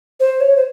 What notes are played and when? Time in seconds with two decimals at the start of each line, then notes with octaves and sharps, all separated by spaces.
0.20 C5
0.41 C#5
0.56 C5